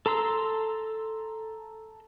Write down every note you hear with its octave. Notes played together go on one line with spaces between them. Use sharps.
A4 A#5 C6 E6